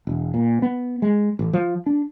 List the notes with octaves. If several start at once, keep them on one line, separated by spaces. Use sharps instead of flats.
E1
A#2
B3
G#3
A1
F3
D4